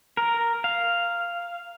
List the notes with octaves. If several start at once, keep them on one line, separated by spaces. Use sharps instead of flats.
A#4
F5